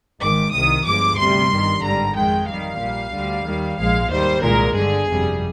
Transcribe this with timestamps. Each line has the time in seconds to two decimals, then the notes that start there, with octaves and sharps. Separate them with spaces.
0.20 G#1 G#2 D#3 D6
0.53 C2 C3 D#3 D#6
0.85 G1 G2 F3 G#3 D6
1.18 D2 C3 G3 C6
1.50 G1 G2 D#3
1.83 G#1 G2 D3 G3 A#5
2.15 F2 D#3 G#3 G5
2.48 F2 D#3 G3 F5
2.80 A#1 A#2 G3
3.13 D2 D3 G3
3.45 D#2 D#3 G3
3.78 A#1 G#2 F3 G#3 F5
4.10 D#2 D#3 G3 C5
4.42 C2 A#2 G#3 A#4
4.75 G1 G2 D3 G#4
5.07 G1 F2 C3 G3